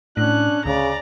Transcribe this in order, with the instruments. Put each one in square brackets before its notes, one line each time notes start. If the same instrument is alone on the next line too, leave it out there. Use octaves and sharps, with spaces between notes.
[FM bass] A2 [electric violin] C#4 F#6 [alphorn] D4
[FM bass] D2 [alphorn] C#3 [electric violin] D5 A#5